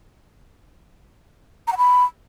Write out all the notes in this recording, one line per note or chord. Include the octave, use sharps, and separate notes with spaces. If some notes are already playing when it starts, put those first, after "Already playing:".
A#5
F#5
B5